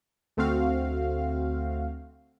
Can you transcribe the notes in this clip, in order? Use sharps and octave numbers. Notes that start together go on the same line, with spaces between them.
D2 A3 C4 F#4 F5